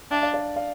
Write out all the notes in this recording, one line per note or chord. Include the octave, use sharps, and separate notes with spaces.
D4 E5 G5
D5 F5
D5 F5
D5 F5